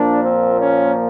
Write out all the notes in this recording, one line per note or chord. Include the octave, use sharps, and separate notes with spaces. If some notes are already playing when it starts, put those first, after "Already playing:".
Already playing: A#2 F3 A#3 D4
C4
C#4